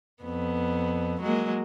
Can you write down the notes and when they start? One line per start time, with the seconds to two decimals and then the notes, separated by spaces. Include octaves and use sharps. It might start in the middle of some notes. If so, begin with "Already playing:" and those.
0.23 F2 B3
1.20 F#3 G#3 A#3